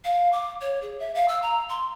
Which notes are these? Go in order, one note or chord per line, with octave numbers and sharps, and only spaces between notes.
F5
D6
C#5
G#4
E5
F5
E6
A#5
C6